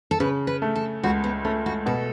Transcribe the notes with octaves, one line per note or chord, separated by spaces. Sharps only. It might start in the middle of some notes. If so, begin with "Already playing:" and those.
A4
C#3 B4
B4
A3
A4
C#2 F#4
B3
A3 C#4
F#4
B2 A4